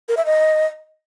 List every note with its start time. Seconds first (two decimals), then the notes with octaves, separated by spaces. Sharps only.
0.09 A#4
0.17 E5
0.25 D#5